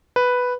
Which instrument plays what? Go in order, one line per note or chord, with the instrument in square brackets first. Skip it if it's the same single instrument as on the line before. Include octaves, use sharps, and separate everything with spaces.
[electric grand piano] B4